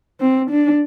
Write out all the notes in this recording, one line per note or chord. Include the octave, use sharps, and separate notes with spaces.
C4
D4